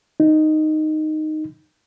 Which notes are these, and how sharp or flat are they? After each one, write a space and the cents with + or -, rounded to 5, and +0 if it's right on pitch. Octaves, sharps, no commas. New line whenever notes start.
D#4 -5